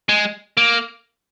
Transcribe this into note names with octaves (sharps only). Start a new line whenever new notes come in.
G#3
A#3